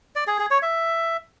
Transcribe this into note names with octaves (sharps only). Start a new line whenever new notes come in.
D5
G#4
G#4
C#5
E5